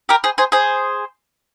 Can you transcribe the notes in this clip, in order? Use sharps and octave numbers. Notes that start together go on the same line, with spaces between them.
G4 A#4
G#4 C5
G#4 C5
G#4 C5